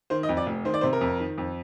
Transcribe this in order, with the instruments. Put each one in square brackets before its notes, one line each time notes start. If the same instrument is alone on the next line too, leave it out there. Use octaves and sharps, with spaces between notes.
[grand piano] D#3 C5
D#5
F2
D5
F1
D#3 C5
D5
C3 C5
A#4
F2
D#3
F2